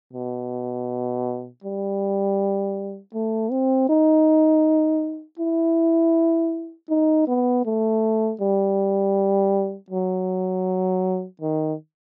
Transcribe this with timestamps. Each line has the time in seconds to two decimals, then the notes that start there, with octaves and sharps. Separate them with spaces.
0.13 B2
1.64 G3
3.14 A3
3.51 C4
3.89 D#4
5.39 E4
6.89 D#4
7.27 B3
7.65 A3
8.41 G3
9.90 F#3
11.41 D#3